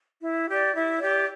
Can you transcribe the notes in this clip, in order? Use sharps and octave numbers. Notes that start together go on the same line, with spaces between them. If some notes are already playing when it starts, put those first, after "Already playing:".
E4
G4 D5
E4
G4 D5